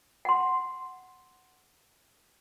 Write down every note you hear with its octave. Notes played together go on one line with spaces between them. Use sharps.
F#5 C6